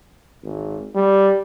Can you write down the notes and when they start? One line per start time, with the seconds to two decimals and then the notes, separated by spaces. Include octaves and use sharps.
0.43 G#1
0.95 G3